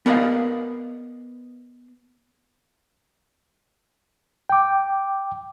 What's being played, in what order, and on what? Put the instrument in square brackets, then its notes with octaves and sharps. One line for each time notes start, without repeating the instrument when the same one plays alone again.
[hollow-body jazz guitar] B3 A#4 D5 D#5 F5
[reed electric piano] G5 D6